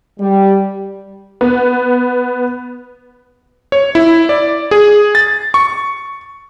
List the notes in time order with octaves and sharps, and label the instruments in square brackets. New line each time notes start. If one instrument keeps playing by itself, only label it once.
[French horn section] G3
[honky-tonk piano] B3
[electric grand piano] C#5
E4
D5
G#4
A6
C#6